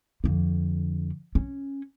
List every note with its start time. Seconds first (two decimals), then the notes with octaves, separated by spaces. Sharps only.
0.24 F2 D3
1.35 C#4